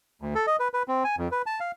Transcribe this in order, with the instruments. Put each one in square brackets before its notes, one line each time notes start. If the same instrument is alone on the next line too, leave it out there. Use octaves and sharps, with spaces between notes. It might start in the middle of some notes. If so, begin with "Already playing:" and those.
[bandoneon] D2
A4
D#5
B4
B4
C4
G#5
F2
B4
A5
F5